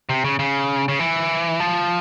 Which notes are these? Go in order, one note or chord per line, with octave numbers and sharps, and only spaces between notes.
C3
C#3
C#3
C#3
E3
F3